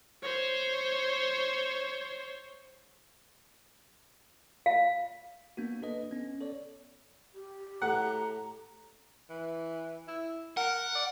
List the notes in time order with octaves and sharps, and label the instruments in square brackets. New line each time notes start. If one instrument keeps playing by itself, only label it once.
[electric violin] C5 C#5
[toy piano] F5
[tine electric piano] A#3 B3 D4 F#4
D4 A4 B4 D#5
B3 C#4
A4 C#5 D5
[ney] G4
[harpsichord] A2 [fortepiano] F#5 [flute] A#5
[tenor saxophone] E3
E4
[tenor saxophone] A#4 [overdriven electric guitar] F#5
[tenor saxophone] D5